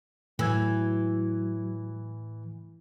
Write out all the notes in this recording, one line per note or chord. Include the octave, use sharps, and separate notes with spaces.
A2 E3 F#3 E6 G#6